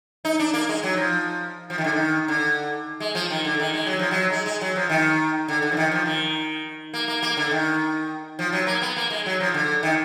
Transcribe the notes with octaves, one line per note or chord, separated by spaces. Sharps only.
D#4
D4
A#3
G#3
F#3
F3
F3
D#3
D3
D#3
D3
G#3
F3
D#3
D3
D#3
G#3
F#3
F3
F#3
G#3
G#3
F#3
F3
D#3
D3
D3
F3
D#3
F3
D#3
A#3
A#3
A#3
D3
D#3
F3
F#3
A#3
B3
A#3
G#3
F#3
F3
D3
D#3